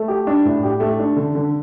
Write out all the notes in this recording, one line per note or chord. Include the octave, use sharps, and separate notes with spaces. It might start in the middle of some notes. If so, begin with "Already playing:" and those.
Already playing: A3
G4
D4
A2
G4
A3
D4
D3
D3